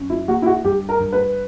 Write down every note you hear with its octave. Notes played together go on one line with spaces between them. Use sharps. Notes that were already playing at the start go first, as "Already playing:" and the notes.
Already playing: F#2 C#4
E4
A#3 F#4
E4
F#4
G2 G4
A#4
G2
B4